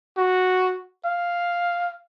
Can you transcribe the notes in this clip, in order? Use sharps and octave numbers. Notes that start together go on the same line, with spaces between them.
F#4
F5